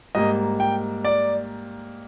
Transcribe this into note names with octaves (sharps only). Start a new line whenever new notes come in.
G#2 G3 A#3 D#5
G5
D5